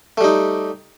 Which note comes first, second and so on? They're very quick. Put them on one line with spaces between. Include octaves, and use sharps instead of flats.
A3 G3 D#4